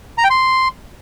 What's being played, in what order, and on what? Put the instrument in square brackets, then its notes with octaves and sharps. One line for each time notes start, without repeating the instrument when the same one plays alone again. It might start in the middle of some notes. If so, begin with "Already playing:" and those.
[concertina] A#5
G5
C6